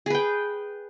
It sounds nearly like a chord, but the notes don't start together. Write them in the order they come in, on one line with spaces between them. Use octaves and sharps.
G#4 B4 G5